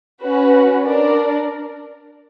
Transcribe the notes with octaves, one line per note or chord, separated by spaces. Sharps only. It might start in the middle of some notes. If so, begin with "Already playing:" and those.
C#4 F#4 B4
D4 A#4 D5